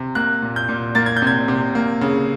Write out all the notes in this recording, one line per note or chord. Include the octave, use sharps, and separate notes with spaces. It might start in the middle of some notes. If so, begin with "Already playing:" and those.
Already playing: C3
A#3 F#6
A#2
G6
A#2
A#3 A6
G#6
G6
C3 G#6
C3
A#3
C#3